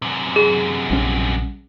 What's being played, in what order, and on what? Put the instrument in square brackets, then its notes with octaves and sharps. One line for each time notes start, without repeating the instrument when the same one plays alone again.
[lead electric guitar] F#2 C3
[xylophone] G#4
[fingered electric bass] A#1 G3 C#4